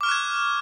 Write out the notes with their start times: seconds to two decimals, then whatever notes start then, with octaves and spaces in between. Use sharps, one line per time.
0.01 D6
0.03 F6
0.06 C#6
0.09 F#6
0.11 G#6